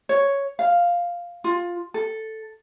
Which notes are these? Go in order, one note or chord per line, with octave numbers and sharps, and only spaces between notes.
C#5
F5
F4
A4